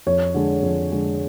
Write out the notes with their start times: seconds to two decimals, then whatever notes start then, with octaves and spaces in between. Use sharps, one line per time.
0.06 F2 C#5
0.34 D3 G#3
0.62 F2
0.91 D3 G#3